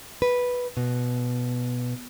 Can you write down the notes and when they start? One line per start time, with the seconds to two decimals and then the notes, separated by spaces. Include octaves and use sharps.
0.22 B4
0.77 B2